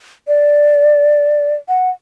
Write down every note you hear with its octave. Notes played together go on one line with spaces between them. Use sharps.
D5
F#5